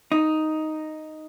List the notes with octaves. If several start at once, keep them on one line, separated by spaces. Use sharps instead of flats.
D#4